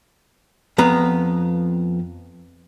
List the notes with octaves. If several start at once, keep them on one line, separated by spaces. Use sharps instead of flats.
F2 B3 A#5